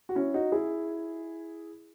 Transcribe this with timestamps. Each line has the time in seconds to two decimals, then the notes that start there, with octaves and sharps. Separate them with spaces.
0.09 F#4
0.15 C#4 E4
0.34 D#4 F#4
0.52 E4 G#4